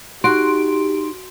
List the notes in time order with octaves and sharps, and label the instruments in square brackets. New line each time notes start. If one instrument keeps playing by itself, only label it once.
[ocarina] D#4 [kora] F#4 [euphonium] G4 [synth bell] C6 D7